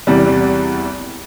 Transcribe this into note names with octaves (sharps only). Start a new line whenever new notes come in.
E2 C3 E3 G3